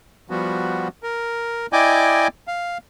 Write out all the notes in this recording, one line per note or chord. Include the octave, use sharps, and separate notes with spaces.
F3 G3 B3 F#4
A#4
E4 D5 D#5 G5 G#5 D6
F5